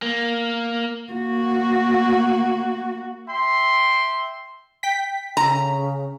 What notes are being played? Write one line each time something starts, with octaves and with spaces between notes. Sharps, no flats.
A#3
A#3 F#4
E5 G5 C6
G5 B6
C#3 A#5